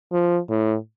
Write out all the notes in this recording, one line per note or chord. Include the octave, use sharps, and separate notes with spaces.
F3
A2